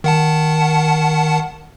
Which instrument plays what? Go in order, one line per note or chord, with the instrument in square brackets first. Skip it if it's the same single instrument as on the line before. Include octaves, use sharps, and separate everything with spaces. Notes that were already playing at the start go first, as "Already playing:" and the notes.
[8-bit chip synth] D#3 F#5 A5